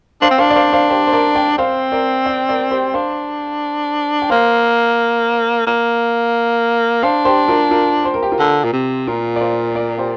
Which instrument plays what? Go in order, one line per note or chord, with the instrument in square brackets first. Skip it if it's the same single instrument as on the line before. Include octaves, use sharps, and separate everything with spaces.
[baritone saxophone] D4 [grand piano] C5 F5
[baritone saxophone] C4
[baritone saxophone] D4 [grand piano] C5 F5
[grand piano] D5
C5 F5
C5 F5
G4 C5
C5
A#4 D5
D5 G5
[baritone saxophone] C4 [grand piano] C5 F5
[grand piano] A#4 D5
D5 G5
A#4 D5
G4 C5
[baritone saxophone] D4 [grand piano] C5 F5
[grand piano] G5
[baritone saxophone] A#3 [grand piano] C5 F5
[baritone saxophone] A#3
[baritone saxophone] D4 [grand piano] C5 F5
[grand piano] G4 C5
F4 A#4
F4 A#4
C5
A#4
G4
F4 A#4
[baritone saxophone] D3
A#2
C3
[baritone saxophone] A#2 [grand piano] F4 A#4
[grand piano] D5
C5 F5
A#4 D5
G4 C5